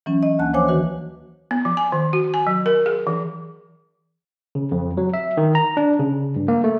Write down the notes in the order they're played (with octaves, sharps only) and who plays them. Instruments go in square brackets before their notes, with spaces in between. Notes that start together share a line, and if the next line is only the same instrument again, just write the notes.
[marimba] E3 F#3 C#4
D#5
D2 A#3 G#5 A5 F#6
E3 F3 C5 C#5 G#5 D6
D#3 E3 F#4 B4
[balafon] B3
F3
G#5
D#3
F#4
G#5
F#3
A#4
G#4
E3
[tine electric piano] C#3
F2
F#3
E5
D#3
A#5
D4
C#3
G2
A#3
A3